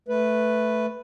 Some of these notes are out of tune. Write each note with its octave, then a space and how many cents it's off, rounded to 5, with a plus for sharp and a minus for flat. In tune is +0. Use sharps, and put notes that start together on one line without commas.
A3 +0 B4 +0